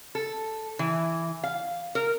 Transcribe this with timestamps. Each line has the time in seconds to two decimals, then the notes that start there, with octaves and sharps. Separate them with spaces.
0.15 A4
0.79 E3
1.44 F5
1.95 A#4